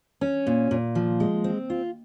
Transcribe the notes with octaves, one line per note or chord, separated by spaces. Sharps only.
C#4
A#2
A#2
F3
G#3
C4
F4